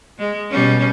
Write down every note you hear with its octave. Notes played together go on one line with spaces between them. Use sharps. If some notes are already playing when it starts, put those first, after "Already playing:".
G#3
B2 G3 C#4